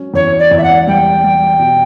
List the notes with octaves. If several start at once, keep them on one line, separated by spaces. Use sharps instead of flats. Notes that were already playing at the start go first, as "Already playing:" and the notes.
Already playing: F#3 C#4
E2 C#5
D5
E2
E5
F#5
G3 G5
G3
B2